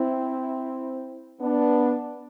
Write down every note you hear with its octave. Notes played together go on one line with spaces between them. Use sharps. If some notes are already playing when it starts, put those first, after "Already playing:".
Already playing: C4 E4
B3 D4